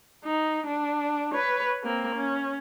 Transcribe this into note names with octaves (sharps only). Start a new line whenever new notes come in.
D#4
D4
B4 C#5
A#3 C4
C#4